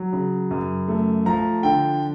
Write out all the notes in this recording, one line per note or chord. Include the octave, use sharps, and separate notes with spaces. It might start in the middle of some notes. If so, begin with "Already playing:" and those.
Already playing: F#3
C#3
F#2
A3
F3 A#5
D3 G5